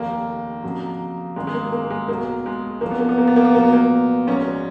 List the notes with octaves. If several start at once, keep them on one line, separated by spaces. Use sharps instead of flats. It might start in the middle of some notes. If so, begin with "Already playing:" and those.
Already playing: F1 D#2 D#3 A#3
F2 C#3 F#3
G#1 F#2 D#3 G#3
G#3
A#3
A#3
G#3
B1 B2 F#3 A#3
G#3
F#1 F2 F3 A#3
B3
A#3
B3
A#3
B3
A#3
B3
A#1 A#2 F#3 A#3
B3
A#3
A#1 G#2 F#3 C#4